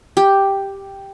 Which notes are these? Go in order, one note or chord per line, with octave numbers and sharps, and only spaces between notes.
G4